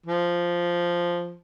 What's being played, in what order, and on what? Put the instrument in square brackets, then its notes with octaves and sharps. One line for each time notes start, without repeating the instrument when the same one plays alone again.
[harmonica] F3